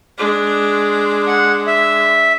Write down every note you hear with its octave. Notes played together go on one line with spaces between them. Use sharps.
G#3 D4
F#5
E5